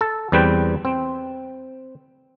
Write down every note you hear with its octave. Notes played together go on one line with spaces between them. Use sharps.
A4
E2 G3 C4 B4 G5
C4